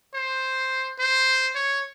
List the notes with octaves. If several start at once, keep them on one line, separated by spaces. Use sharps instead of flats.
C5
C5
C#5